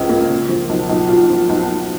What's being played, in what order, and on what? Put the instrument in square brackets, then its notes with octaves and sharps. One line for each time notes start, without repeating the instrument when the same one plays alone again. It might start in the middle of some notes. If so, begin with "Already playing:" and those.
Already playing: [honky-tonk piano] C#2 C#3 F3
A#3
A#2
F3
B1
B1
A#2 F4
F3
B1
B1